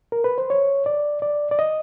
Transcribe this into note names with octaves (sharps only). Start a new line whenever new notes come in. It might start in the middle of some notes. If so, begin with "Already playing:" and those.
A#4
B4
C5
C#5
D5
D5
D5
D#5